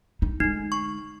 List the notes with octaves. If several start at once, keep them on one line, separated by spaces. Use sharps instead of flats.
D#4
D3 G#3 D#4
C#6